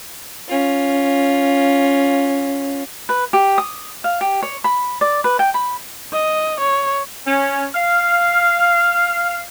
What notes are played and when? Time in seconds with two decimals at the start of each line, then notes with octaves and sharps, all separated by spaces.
0.48 C#4 F4
3.09 B4
3.33 G4
3.58 D#6
4.04 F5
4.21 G4
4.43 C#5
4.64 B5
5.01 D5
5.24 B4
5.39 G5
5.54 B5
6.12 D#5
6.60 C#5
7.25 C#4
7.74 F5